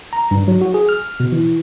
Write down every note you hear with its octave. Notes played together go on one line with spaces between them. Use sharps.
A#5
G2
F#3
F#4
G#4
F6
B2
E3